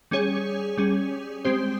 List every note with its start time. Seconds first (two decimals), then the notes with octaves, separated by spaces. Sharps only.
0.11 G3 C#4 G#4 C#5
0.78 G3 C#4 G#4
1.45 G#3 C4 G4 C5